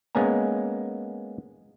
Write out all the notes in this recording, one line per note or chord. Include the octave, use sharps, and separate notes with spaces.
G#3 A#3 B3 C#4 G#5 A#5